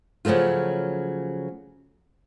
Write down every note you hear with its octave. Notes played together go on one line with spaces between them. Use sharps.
C#3 F3 F#3 A3 F4